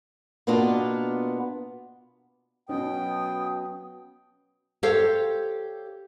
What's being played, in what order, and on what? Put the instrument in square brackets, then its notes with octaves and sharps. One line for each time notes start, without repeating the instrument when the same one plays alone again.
[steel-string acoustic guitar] B2 A#3 B3 D4 F4
[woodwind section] B2 [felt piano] F#3 B3 C#4 [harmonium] G5 [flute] D#6
[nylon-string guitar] G4 A4 C5 C#5 F5